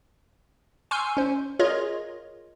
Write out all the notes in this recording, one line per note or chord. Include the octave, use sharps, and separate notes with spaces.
G#5 C6 C#6 E6 F6 G6
C#4 C5
F4 G#4 A#4 C#5 D#5